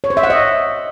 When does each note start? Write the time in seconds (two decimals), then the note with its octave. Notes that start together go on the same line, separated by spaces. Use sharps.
0.04 C#5
0.10 C5
0.17 E5
0.23 F#5
0.30 D#5